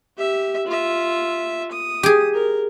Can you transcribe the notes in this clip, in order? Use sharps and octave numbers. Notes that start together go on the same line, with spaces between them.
G4 E5
F4 E5
D#6
G4 G#4
A#4